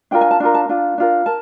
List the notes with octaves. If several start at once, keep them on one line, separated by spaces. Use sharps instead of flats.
D4 F4 A#4 G5
G#5
A5
D4 F4 A#4
A5
D4 F4
D4 F4 A#4
A#4 A5